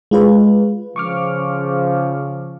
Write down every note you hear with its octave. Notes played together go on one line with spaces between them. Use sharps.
G#3 F4 B4
C#3 F3 C#6 D6 F6